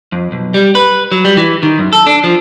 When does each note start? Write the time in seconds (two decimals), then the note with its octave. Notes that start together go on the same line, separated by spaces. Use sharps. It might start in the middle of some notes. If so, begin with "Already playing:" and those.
0.12 F2
0.32 B1
0.54 G3
0.75 B4
1.12 F#3
1.25 G3
1.37 E3
1.63 D#3
1.79 F#2
1.93 A4
2.07 D4
2.24 F3